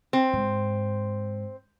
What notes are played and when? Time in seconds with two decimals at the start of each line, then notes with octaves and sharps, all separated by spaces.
0.13 C4
0.33 G#2